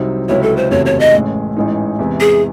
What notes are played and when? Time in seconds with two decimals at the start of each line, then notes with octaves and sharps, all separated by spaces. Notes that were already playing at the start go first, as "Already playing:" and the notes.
Already playing: C2 C3 F#3 C4 D#4
0.29 C#2 C3 F#3 C#4 E4 C#5
0.43 A4
0.57 C5
0.71 F#1 E2 C3 F#3 A3 C#5
0.86 C#5
1.00 D#5
1.13 A1 A2 G#3
1.57 A1 G#2 E3 G#3 D#4
1.99 E2 C3 E3 G#3
2.20 G#4